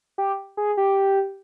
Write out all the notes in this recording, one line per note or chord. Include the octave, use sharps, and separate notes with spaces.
G4
G#4
G4